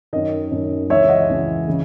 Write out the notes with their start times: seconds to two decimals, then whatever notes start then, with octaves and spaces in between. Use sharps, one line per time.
0.13 F#2 D#3 D#5
0.51 F#2 D#3
0.90 C#2 C#3 E3 C#5 E5
1.09 D#5 F#5
1.29 C#2 C#3 E3
1.68 C#3 E3